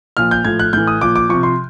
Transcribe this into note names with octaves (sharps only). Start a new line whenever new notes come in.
A#2 F3 F6
G6
A2 F3 G#6
F#6
A2 E3 G6
D#6
A#2 F3 D6
D6
C3 F3 C#6
C6